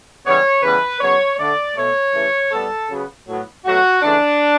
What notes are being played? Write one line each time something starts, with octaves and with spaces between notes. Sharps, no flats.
C#3 E3 G3 B3 C#5
C#3 E3 G3 B3 B4
C#3 F#3 B3 C#5
D3 A3 D5
B2 A3 C#5
C#3 E3 A3
A2 G3 B3 A4
C#3 F#3 B3
A2 F#3 B3
B2 F#3 A3 F#4
C#3 E3 A3 D4